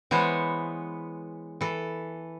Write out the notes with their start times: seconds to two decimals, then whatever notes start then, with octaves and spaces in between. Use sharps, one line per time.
0.11 E3 G#3 B3 C5 C#5
1.61 E3 A4